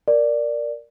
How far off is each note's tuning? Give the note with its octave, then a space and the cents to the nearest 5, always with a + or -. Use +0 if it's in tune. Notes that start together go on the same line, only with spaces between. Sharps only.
A#4 +0 D5 +0